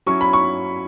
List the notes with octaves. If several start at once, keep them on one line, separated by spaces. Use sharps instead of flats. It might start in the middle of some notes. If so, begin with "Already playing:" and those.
F#3 C#4 E4 C#6
B5
C#6